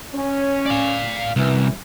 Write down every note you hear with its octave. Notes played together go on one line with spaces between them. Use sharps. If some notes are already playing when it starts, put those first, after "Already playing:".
C#4
D5 F5
C2 F#2 E3